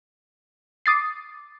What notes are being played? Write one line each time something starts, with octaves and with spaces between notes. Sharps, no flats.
D6 D#6 A6 C7